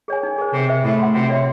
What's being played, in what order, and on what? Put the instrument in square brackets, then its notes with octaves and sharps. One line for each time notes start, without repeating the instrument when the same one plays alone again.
[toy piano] G#4 C#5 G#5
D#4
G#4 C5
[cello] C3 [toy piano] G#4
[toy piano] C5 E5
[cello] A2 [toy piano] C5
[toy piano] F#5 C6
[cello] C3 [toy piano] F#4
[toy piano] C#5 E5 C6